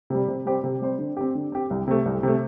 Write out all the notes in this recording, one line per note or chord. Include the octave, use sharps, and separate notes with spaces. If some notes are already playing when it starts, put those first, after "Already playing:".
C3 G3
C3
G3 C4 G4 C5
C3
G3 C4 G4 C5
D3
C4 G4
D3
C4 G4
C2
C3 A3
C2
C3 A3